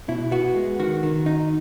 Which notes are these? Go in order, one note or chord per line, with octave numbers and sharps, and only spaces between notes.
B2 E4
B3 F#4
G#3
D#3 F#4
D#3
D#4